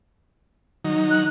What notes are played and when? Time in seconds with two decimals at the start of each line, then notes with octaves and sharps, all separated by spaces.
0.85 D#3 F#3 D#4
1.11 F#6